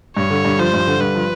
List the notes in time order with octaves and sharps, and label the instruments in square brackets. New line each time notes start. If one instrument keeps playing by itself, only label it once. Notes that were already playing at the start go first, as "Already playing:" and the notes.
[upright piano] G2 [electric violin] C#5
[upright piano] D3
G2
[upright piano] F3 [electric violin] C5
[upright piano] G2
D3
[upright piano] G2 [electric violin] B4
[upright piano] F3